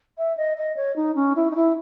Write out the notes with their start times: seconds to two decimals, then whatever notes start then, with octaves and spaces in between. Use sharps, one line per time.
0.18 E5
0.37 D#5
0.57 D#5
0.76 C#5
0.96 D#4
1.16 C#4
1.36 E4
1.51 D#4
1.55 E4